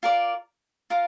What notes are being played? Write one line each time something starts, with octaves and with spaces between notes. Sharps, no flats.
F4 A#4 D5
F4 A#4 F5